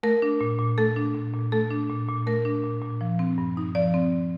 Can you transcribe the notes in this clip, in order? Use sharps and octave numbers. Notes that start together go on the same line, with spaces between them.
A3 A#4
D4
A#2
A#2
A3 A4
D4
A#2
A#2
A3 A4
D4
A#2
A#2
A3 A#4
D4
A#2
A#2
F3
C4
G2
D#4
F3 D5
C4